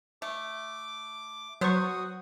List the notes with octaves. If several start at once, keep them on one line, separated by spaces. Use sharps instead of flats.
A3 D6
F#3 B3 F#4 C5 F#5 C#6 D#6